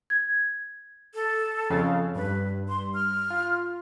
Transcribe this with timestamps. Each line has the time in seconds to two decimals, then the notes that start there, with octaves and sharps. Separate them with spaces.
0.10 G#6
1.14 A4
1.70 F2 C#3 F5
2.15 G2 B4
2.69 C6
2.94 F6
3.30 F4